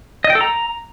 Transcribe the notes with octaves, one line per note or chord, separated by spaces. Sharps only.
D#5
G5
A4
A#5